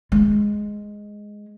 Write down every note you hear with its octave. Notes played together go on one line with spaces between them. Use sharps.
G#3